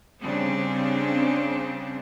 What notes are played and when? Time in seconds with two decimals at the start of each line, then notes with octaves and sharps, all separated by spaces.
0.21 C#3 G3 C4 D4